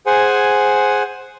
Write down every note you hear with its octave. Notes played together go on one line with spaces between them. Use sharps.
G#4 C5 F#5 G#5